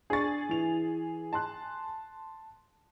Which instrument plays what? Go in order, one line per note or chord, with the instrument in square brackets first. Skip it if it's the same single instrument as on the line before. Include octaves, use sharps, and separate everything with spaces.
[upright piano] D4 C#6 [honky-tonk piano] G#4 A6
[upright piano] E3 F7
A5 C6 F#6